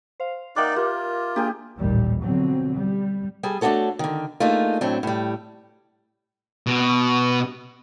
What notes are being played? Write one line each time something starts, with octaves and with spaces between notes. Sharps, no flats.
C5 F5
A#3 D#4 D5 E5 F#5 G5 D6 F#6
A#3 F4 G4
A#3 D4 G4 G#4 G5
A1 D#2 A#2 G3
B2 D3 F3 F#3 C4
G3
G3 G#4 A4
A3 D4 D#4 F#4 A4 C#5
D3 D#3
A3 A#3 D4 D#4 F4 G#4
A2 F#3 C4 D4
A2 G3
B2